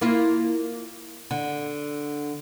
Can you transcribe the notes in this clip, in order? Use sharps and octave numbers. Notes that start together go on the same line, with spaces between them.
A#3 E4 F4
D3